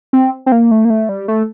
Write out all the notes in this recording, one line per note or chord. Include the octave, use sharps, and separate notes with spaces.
C4
C4
A#3
A3
A#3
A3
G3
A3